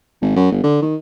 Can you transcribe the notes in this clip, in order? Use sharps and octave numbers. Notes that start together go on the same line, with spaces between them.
G#1
F#2
G1
D3
D#3